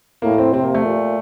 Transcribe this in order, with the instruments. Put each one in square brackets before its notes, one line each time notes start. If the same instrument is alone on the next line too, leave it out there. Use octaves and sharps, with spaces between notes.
[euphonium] A2 [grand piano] A#3
[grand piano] C4
[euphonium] C3 [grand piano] C4
[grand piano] A#3
A3
[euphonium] A#2